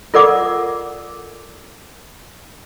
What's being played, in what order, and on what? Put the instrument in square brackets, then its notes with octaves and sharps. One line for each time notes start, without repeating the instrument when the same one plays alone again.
[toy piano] F4 A4 A#4 D5 F#5 D6